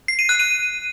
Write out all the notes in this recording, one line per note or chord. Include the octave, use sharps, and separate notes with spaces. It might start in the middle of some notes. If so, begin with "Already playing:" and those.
C7
D#7
F#6
D#7